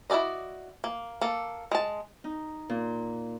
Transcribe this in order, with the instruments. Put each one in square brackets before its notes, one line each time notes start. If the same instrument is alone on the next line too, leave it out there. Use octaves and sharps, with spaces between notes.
[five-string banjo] E4 F#4 A4 D5 D#5
A#3
A#3 A4
G#3 A5
[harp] D#4
A#2